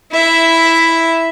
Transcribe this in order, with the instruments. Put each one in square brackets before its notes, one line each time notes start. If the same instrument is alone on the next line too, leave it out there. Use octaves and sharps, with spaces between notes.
[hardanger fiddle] E4 E5